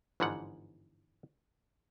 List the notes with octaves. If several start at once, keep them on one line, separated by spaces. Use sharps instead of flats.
G1 G#2 E3 F3 F#5